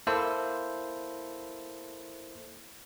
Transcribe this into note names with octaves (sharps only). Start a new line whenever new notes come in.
A#3 E4 A4 C5